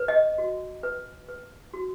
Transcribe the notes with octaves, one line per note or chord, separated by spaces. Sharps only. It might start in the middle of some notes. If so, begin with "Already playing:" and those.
Already playing: B4
D#5
F#4
B4
B4
F#4